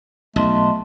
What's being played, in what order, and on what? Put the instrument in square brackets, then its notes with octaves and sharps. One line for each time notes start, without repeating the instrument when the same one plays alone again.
[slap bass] B1 [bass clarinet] A3 [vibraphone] D#5 A5 C6